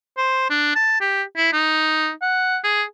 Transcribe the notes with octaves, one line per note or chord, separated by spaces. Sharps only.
C5
D4
A5
G4
E4
D#4
F#5
G#4